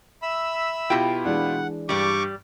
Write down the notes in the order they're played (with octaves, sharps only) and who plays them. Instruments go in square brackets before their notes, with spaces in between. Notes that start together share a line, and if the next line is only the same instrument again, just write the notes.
[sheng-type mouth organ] E5 B5 E6
[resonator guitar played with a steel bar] B2 G5 [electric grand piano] E4 F4 G4
[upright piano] E3 G#3 D4 [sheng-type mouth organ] F#5
[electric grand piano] G2 G4 [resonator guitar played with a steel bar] G3 D5 [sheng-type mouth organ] C#6 D6